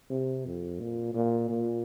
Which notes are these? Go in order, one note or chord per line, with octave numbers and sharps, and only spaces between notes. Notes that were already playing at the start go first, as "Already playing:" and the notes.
C3
F2
A#2
A#2
A#2